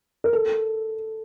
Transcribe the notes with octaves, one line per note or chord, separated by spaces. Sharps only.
A#4
A4